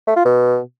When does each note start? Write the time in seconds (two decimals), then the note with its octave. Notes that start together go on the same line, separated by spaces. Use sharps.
0.07 A3
0.16 F4
0.25 B2